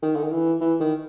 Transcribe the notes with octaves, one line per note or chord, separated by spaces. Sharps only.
D#3
D3
D#3
E3
E3
D#3